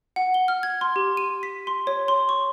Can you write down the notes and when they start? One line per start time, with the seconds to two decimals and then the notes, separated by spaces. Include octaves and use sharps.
0.16 F#5
0.34 G7
0.48 F6
0.63 G#6
0.81 C6
0.96 G4
1.17 D#7
1.43 B6
1.67 C6
1.87 C#5
2.08 C6
2.29 C#6